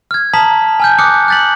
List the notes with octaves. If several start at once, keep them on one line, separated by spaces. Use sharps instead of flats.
F6 G#6
A5 A#5 D#6 B6 F#7
G#5 F6 G6
D6 D#6 F6 F#6 C#7
F#6 G6 A6 B6 F#7